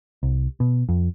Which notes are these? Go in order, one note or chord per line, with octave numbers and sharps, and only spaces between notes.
C2
B2
F2